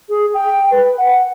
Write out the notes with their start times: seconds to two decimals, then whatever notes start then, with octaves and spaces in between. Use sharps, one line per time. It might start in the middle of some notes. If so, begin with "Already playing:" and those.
0.09 G#4
0.34 G5
0.71 B4
0.98 F#5